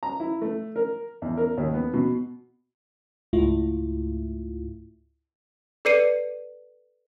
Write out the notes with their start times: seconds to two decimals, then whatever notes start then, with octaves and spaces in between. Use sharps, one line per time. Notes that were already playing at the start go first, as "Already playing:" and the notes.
0.03 A#5
0.20 E4
0.42 A3
0.76 A#4
1.22 E2
1.37 A#4
1.57 D#2
1.74 B3
1.93 B2
3.33 C#2 G#2 A3 E4 F4
5.85 A4 B4 D5 C7 C#7 D#7